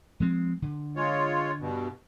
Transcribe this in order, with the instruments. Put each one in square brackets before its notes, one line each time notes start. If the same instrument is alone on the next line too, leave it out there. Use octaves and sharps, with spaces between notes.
[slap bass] F3 G#3 C4
D3
[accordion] G#3 F4 C#5
G2 B2